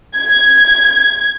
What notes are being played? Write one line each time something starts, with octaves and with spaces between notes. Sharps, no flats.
G#6